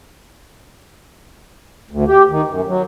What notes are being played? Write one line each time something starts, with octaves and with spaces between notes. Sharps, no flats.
D2
G4
D#3
F#2
F#3